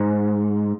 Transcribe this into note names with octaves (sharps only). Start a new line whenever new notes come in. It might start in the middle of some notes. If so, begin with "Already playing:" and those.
Already playing: G#2